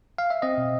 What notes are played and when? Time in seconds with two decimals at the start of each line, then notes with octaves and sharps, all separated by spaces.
0.18 F5
0.30 E5
0.42 C4 D#5
0.58 B2